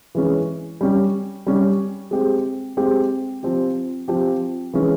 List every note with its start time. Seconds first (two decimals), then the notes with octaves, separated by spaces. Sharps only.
0.15 E3 G#3 C#4
0.81 G3 C#4 G4
1.47 G3 C#4 G4
2.11 G#3 C4 G4
2.77 G#3 C4 G4
3.43 F3 C4 G4
4.08 F3 C4 G4
4.74 E3 G#3 C#4